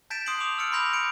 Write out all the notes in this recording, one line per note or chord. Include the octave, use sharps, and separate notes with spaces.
A5 G6 A6 B6 D7 E7
C6 D#6 F#6 C7 D7 F#7
D6 F7
E6 F6 A6 C#7 D7
B5 C6 D6 G6 A#6 F7
G6 C#7 D7